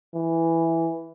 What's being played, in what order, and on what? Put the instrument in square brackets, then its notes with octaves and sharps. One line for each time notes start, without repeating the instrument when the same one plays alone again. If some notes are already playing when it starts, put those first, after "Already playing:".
[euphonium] E3